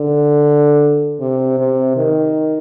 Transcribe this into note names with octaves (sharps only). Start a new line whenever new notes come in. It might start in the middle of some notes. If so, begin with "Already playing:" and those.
Already playing: D3
C3
C3
D#3